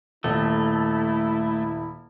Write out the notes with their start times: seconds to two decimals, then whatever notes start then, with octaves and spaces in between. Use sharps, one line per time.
0.24 D#1 A3 E4